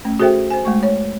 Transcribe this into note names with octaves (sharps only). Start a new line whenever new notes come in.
A3 C#4
F#4 G#4 A4 C5 E5 G5
C5 G#5
G#3 A3 C#6
C#5